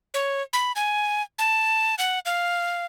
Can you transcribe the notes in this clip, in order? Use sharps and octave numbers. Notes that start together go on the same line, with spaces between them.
C#5
B5
G#5
A5
F#5
F5